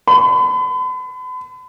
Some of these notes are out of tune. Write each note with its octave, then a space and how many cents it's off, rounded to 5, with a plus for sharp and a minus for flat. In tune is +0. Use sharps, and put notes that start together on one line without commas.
B5 +40